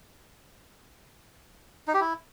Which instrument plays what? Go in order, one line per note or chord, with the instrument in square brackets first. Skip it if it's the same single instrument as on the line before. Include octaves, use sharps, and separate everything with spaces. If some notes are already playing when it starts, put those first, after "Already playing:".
[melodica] D#4
G4
E4